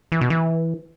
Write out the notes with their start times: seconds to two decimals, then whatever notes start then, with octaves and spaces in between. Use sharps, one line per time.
0.12 E3
0.21 B2
0.30 E3